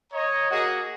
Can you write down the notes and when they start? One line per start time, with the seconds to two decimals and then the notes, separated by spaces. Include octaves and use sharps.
0.12 C#5 D#5 A#5
0.51 A#3 F#4 G#4 A#4 D#5 F#5